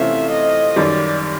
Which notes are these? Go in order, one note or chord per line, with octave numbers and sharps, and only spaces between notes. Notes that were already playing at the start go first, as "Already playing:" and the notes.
Already playing: C3 E3 A3 C#4 F4 E5
D#5
F#2 D#3 G3 D5